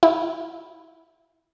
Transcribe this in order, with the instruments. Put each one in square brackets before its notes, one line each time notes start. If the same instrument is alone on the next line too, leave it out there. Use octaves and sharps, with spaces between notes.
[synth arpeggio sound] E4